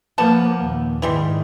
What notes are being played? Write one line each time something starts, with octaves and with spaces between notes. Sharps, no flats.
F3 A#3 B3 F#5 A5
D#2 A#2
G#2 D#3 E3 G3 G#3